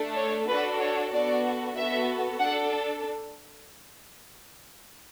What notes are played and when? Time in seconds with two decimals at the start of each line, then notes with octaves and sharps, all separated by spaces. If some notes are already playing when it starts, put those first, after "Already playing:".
Already playing: A3 D4 A4
0.16 C#5
0.48 D4 F#4 A4 B4
0.80 C#5
1.12 B3 D4 F#4 A4 D5
1.77 B3 F#4 A4 E5
2.40 D4 A4 F#5